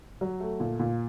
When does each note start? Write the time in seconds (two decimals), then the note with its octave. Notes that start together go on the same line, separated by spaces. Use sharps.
0.21 F#3
0.40 A3
0.60 A#2
0.80 A#2